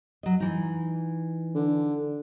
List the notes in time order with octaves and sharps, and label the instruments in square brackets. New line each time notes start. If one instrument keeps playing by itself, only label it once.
[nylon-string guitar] F#3 D#5
E3 D#4
[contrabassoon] D3